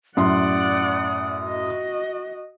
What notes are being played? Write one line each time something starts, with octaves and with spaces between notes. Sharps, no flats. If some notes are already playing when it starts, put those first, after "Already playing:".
F#2 A2 D5 F#5 C6 D#6
F#4 D#5